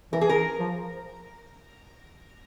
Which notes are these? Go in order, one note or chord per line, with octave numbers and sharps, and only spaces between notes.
E3 A#4
G#4
A#4
F3